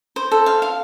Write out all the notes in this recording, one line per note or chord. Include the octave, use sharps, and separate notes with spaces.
C5
A4
F5
F5